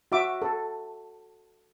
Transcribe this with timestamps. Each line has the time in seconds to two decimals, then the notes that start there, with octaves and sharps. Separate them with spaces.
0.12 F#4 E5 D6
0.42 A4